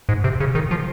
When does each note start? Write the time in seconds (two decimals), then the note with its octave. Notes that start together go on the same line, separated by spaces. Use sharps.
0.09 G#2
0.24 C3
0.40 C#3
0.55 D#3
0.71 F3